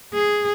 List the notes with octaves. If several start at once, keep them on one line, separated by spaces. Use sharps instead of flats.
G#4